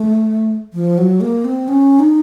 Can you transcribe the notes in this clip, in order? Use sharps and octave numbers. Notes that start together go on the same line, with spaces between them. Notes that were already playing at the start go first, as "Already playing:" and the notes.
Already playing: A3
F3
F#3
A#3
C4
C#4
D#4